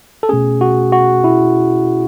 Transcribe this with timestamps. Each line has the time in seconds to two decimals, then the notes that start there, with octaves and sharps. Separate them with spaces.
0.23 A4
0.29 B2 A3 C#4 G#4
0.61 F#4
0.92 F#4
1.24 E4